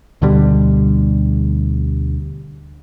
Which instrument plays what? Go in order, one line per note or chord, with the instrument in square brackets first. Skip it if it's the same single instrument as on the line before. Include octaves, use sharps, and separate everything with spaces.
[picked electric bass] D2 B2 D3 G3